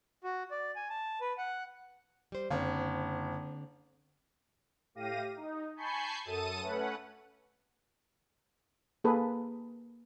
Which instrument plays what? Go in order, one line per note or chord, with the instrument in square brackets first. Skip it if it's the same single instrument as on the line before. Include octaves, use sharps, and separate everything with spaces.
[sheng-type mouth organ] F#4
D5
G#5
A5
B4
F#5
[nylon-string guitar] G3 C5
[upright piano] F#1 [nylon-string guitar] D3 C4
[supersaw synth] A2 G4 F5 A#6 D#7
D#4
G#5 A5 B5 C#6 G6 C7
F#2 A4 A5 D#6 D#7
A3 C#4 B4 F#5
[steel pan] A#3 G#4 A4 B4